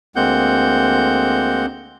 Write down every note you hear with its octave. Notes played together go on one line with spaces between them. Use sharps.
D2 G#3 A#3 C4 F#5 G6